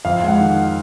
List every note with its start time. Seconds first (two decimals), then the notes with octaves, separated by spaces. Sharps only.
0.05 F2 F5
0.23 G#3 F#5
0.40 D#3